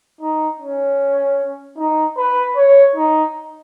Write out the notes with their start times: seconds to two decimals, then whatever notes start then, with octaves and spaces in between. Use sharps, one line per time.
0.21 D#4
0.60 C#4
1.78 D#4
2.17 B4
2.56 C#5
2.95 D#4